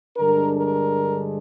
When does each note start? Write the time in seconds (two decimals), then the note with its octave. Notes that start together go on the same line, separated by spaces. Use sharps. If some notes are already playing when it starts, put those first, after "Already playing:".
0.17 G2 D3 G#3 D4 A#4
0.56 A#4